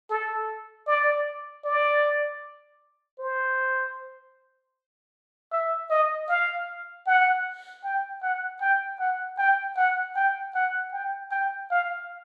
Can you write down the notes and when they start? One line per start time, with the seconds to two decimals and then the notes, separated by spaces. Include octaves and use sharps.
0.10 A4
0.87 D5
1.65 D5
3.19 C5
5.52 E5
5.90 D#5
6.29 F5
7.07 F#5
7.84 G5
8.22 F#5
8.61 G5
9.00 F#5
9.38 G5
9.77 F#5
10.16 G5
10.54 F#5
10.93 G5
11.31 G5
11.71 F5